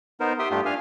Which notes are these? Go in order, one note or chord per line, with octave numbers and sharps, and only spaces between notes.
B3 D#4 A#4 C5
G4 E5 G5 C6 D#6
G2 A3 D4 F4 G4
D4 F5 G#5 F6